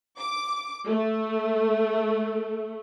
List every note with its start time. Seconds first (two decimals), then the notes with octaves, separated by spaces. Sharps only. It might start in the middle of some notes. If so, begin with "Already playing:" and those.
0.18 D6
0.87 A3